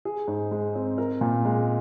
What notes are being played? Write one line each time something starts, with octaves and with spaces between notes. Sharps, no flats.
G#4
G#2
G#3
C4
A#4
A#2
G#3